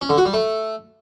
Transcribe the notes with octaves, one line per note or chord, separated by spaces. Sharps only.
C#4
D3
F#4
G3
A3